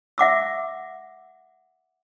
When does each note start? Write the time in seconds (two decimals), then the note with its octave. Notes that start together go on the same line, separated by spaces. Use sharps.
0.18 E5 F#5 D6 E6